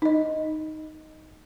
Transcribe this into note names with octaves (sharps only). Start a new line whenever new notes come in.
D#4 D#5